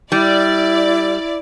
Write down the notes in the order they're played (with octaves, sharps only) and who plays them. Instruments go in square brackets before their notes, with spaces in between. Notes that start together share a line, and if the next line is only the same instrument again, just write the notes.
[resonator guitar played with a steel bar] G3 [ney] E4 [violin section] D5